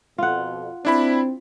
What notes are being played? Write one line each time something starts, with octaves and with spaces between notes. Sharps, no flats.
F2 B2 F4 F#5
C4 D4 E4 B5